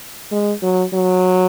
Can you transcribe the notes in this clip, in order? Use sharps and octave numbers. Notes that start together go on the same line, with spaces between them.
G#3
F#3
F#3